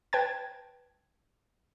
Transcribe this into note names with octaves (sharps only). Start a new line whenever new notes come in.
B4 G5 A5 G#6